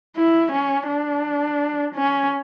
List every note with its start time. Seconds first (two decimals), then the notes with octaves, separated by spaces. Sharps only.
0.16 E4
0.52 C#4
0.88 D4
1.95 C#4